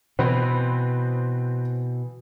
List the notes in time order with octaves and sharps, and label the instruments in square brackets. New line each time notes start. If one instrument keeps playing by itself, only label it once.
[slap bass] B2 E3 [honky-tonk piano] C4 B4